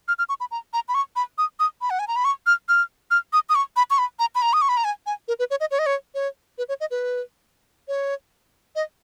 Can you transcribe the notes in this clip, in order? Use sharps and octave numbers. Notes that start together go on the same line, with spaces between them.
F6
F6
C#6
B5
A#5
A#5
B5
C#6
B5
D#6
D#6
B5
F#5
G#5
A#5
B5
C#6
F6
F6
F6
D#6
D#6
C#6
B5
C#6
B5
A#5
B5
A#5
D#6
C#6
B5
A#5
G#5
G#5
A#4
B4
C#5
D#5
C#5
D#5
C#5
C#5
B4
C#5
D#5
B4
C#5
D#5